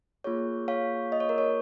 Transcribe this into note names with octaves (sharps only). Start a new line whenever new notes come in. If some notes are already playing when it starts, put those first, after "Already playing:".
A#3 F4 G#4 C#5
C#5 F5
D#5
C#5
A#4
C#5